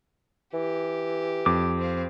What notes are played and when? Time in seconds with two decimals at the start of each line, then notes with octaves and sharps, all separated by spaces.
0.54 E3 G4
1.46 F2 D6
1.79 C4 F5